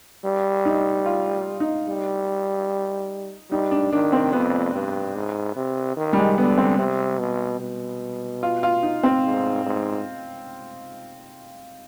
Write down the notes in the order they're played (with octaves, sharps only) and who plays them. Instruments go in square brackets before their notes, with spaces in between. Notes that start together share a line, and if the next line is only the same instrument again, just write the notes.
[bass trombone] G3
[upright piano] D#4
F4
D#4
[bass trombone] G3
[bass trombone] G3 [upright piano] D#4
[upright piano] D4
[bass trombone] D#3 [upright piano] D4
[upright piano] C4
[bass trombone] F2 [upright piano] B3
[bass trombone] G2
G#2
C3
D#3
[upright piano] G3
G#3
[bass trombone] D3 [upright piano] B3
[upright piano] C4
[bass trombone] C3
B2
B2
[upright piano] F4
F4
D#4
C4
[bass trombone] G#2
G#2